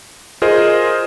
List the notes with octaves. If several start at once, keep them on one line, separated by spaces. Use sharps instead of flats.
F4 G#4 A#4 C5 D#5